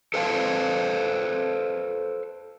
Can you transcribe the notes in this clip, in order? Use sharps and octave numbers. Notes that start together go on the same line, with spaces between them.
A4 B4 C5 F5 F#5 A5